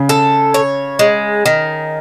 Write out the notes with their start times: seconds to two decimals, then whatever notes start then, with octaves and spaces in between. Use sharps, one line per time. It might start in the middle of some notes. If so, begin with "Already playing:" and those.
Already playing: C#3
0.09 A4
0.54 C#5
0.99 G#3
1.46 D#3